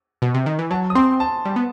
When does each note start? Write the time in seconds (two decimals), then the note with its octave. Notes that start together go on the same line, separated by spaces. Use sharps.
0.22 B2
0.34 C3
0.46 D#3
0.59 E3
0.71 F#3 A5
0.90 D#6
0.95 C4 C6
1.20 A5
1.45 G3
1.56 B3